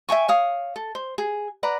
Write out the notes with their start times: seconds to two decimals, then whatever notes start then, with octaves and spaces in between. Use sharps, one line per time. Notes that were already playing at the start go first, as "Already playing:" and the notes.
0.09 E5 G5 G#5 C#6
0.28 C#5 F5 D#6
0.76 A4
0.95 C5
1.18 G#4
1.63 B4 D5 F#5 A#5